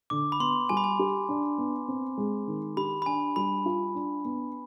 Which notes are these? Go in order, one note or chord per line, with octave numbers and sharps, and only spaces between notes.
D3 D6
B5
B3 C6
G3 G#5
B5
G#5
G4
D4
B3
C4
G#3
D#3
G4 B5
B5
D4 G#5
G3 B5
F4
D4
B3